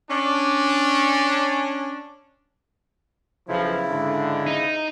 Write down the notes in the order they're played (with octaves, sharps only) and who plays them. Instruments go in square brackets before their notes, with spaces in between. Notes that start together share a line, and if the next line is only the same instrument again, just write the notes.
[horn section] C#4 D4
[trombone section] B1 F3 [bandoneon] C#3 E4
[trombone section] G#2 D3
[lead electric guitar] D#4